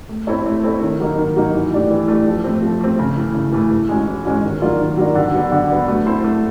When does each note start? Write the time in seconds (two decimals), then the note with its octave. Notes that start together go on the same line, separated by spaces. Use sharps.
0.09 A3
0.27 C4 E4 A4 C#5
0.46 A3
0.64 C4 E4 A4 C#5
0.81 D#3
1.00 F#3 A#3 D#4
1.18 D#3
1.36 F#3 A#3 D#4
1.54 E3
1.72 A3 D4 G4
1.90 E3
2.08 A3 D4 G4
2.27 F3
2.44 A3 C4
2.63 F3
2.81 A3 C4
2.99 C#3
3.16 E3 A3
3.35 C#3
3.52 E3 A3
3.71 E3
3.89 G#3 C#4 F#4
4.07 E3
4.25 G#3 C#4 F#4
4.43 D#3
4.62 F#3 A#3 D4 F4
4.80 D#3
4.97 F#3 A#3 D4 F4
5.15 D3
5.34 F#3 B3 D4
5.52 D3
5.70 F#3 B3 D4
5.88 A3
6.06 C4 E4 A4 C5
6.24 A3